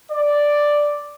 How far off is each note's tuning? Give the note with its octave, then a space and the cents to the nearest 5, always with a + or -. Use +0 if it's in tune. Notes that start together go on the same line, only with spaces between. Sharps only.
D5 +0